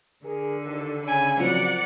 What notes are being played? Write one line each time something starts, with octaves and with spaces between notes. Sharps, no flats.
D3 G#4 A#4
D#2 A4
C#3 G#5 B5
F3 F#3 C4 A#4 D5 F#5